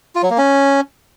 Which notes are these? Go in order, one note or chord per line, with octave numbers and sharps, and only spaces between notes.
F4
F#3
A#3
C#4